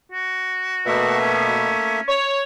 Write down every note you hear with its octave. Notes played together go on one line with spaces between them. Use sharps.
F#4
B2 A3 A#3 E5
C#4
C#5